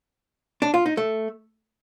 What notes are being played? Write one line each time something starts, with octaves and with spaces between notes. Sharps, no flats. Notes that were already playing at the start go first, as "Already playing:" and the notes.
D4
F4
D#4
A3